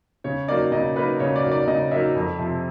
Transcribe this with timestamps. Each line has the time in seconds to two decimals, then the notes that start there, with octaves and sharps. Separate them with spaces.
0.24 C#3 C#5
0.48 F#3 A#3 D#4 D5
0.72 C#3 D#5
0.96 F#3 A#3 D#4 B4
1.19 C#3 C#5
1.36 D5
1.43 F#3 A#3 D#4
1.52 D5
1.67 C#3 D#5
1.91 F#3 A#3 D#4 E5
2.15 F2
2.39 C3 F3